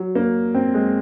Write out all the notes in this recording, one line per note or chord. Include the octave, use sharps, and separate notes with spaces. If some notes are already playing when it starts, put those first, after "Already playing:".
Already playing: F#3
A#3
C4
G#3